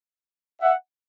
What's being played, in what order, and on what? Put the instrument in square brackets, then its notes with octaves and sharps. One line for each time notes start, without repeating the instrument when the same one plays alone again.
[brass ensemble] E5 F#5